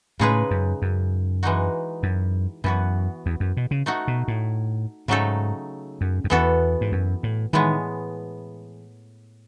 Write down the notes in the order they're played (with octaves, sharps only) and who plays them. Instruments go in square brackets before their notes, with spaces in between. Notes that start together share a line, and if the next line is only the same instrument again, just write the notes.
[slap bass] A2 [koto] C#3 G#3 D#4 G#4 B4
[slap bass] F#2
F#2
[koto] E3 G#3 D#4 F#4
[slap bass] F#2
[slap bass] F#2 [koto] E3 B3 F#4
[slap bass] E2
F#2
B2
C#3
[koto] A3 D#4 F#4
[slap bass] B2
A2
[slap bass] G#2 [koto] C#3 F#3 A3 D#4 A4
[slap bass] F#2
F#2
[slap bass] E2 [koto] E3 B3 F#4 A4
[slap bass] G#2
F#2
A2
[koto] A2 E3 G#3 B3 [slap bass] D#3